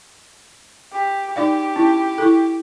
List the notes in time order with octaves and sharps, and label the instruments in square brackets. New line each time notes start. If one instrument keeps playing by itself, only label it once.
[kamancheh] G4
[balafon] D#4 D5 F5 [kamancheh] G4
[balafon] C#4 E4
E4 A4